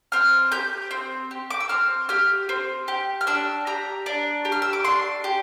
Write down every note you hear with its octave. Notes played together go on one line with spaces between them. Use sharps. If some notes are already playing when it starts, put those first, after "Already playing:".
C4 F6
G4 G6
C4
G4
D6
E6
C4 F6
G4 F6
C4
G4
F6
D4 E6
G4 A#5
D4
G4
F6
E6
D6
D4 C6
G4